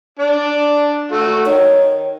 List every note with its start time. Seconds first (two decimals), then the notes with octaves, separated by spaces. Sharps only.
0.19 D4 D5
1.12 A3 F#4
1.46 D#3 C#5